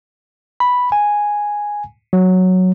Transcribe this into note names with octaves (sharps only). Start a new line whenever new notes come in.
B5
G#5
F#3